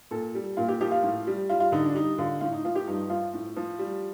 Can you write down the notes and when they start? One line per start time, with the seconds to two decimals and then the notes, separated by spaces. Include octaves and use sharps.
0.11 A#2 A4
0.35 G3
0.57 A#2 F4
0.68 G4
0.81 F3 G4
0.91 F4
1.03 A2
1.27 G3
1.49 G3 F4
1.60 F4
1.72 D3 D#4
1.84 D4
1.95 G3 D#4
2.18 D3 F4
2.41 A2 F4
2.52 D#4
2.65 F3 F4
2.75 G4
2.87 G2 D#4
3.10 F3 F4
3.34 A2
3.57 F3
3.79 G3